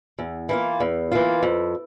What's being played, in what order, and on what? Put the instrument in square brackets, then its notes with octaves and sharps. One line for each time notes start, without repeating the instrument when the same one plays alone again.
[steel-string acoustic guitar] E2
E3 A#3 F4
E2
E3 A#3 F4
F2